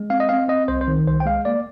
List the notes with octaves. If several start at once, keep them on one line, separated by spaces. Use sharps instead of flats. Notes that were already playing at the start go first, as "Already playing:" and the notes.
Already playing: G#3
C4 F5
D#5
C4 F5
C4 D#5
C2 C5
C5
D#3
C2 C5
G5
G#3 F5
A#3 D5